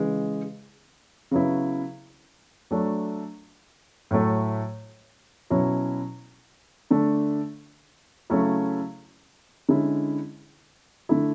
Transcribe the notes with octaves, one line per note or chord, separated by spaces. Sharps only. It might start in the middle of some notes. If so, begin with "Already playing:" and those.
Already playing: C#3 E3 G#3
C#3 F#3 B3 E4
F#3 A3 D4
A2 F#3 A3
B2 F#3 C#4 E4
D3 A3 D4
C#3 F#3 A3 C#4 E4
D3 G#3 C#4 E4
D3 A3 E4